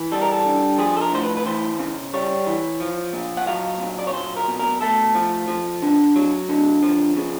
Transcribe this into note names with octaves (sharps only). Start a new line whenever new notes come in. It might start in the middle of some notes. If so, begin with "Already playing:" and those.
Already playing: E3
G3 A4
A#4
A4
D3
F3 G#4
A4
A#4
A2 C5
B4
B4
E3 C5
C#3
G3 C#5
E3
F3
A#2
F#5
F#3 F5
A#2
D5
C#5
F#3 C5
A#4
B2
A#4
A3 A4
F3
F3
D3
F#3
D3
F3
C#3